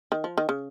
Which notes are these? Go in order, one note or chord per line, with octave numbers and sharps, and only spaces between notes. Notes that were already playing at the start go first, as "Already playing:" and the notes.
D#3
F3
D#3
C#3